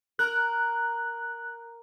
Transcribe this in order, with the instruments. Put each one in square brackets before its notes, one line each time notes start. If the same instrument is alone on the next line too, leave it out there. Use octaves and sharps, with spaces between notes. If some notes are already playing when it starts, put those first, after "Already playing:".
[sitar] A#4 [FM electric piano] F#6